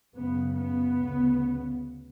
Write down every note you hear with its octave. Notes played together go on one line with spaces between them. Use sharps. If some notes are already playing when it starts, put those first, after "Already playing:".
F#2 C#3 B3
B3
D2 C#3